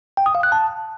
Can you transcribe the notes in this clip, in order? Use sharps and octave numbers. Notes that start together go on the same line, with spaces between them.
G5
D#6
F5
F#6
A5